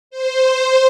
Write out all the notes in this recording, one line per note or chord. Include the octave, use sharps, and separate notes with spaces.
C5